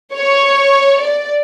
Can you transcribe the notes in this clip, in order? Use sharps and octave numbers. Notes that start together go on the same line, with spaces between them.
C#5
D5